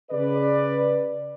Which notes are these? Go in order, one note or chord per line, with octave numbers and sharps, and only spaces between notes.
C#3 B4 D5